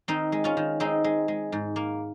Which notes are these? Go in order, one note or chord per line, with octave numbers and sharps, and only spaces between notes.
D#3 C4 D#4
G#3
C#4 F4
D#3
G#3 C4 D#4
G#3
G#3
G#2
A#3